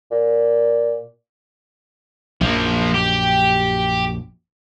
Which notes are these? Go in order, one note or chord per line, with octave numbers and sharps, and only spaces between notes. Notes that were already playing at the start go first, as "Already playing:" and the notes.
A#2
A#1 F#2 F3 A#3
G4